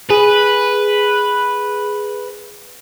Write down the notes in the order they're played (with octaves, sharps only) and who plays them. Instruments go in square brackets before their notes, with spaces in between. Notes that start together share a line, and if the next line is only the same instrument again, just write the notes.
[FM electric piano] G#4 [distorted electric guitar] B4